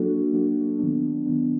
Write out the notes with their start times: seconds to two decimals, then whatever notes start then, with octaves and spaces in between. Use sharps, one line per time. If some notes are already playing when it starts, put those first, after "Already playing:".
Already playing: F#3 A#3 D4 F#4 A4
0.33 F#3 A#3 D4 F#4 A4
0.79 D#3 F#3 B3 D4
1.26 D#3 F#3 B3 D4